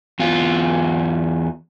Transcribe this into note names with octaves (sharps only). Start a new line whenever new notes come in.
E2 F4